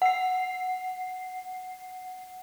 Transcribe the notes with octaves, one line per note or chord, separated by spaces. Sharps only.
F#5 C7